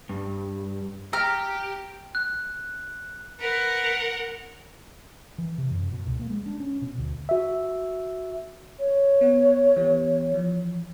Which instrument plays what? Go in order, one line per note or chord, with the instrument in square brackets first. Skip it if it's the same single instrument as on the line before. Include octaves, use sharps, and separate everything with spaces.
[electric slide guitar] G2
[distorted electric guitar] G4 [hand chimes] G5 [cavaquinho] A#5 [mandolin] F6
[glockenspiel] F#6
[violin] A#4 F#5 [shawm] B4
[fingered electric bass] E3
C3
F#2
B2
C#2
A#3
G#3
D4
C#4
B2
D2
[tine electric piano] F#4 E5
[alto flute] C#5
[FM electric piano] B3 F#5
E3 B3 G4
E3 F3